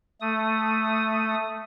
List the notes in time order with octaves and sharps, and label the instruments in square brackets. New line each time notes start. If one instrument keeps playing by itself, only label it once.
[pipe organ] A3 D#6